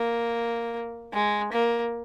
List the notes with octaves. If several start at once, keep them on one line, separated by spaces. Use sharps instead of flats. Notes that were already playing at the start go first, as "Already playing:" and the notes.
Already playing: A#3
G#3
A#3